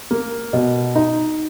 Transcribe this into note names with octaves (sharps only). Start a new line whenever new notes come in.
A#3
B2
D#4